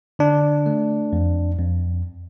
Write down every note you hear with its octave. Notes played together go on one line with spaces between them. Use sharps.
D3 D4
A3
F2
F2